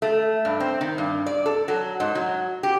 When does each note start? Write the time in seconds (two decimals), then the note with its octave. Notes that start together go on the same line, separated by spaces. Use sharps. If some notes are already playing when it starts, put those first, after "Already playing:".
0.02 A3
0.45 G2
0.60 C4
0.81 D#3
0.98 G2
1.26 D5
1.46 A4
1.68 F#3
2.00 G#2
2.15 F#3
2.63 G4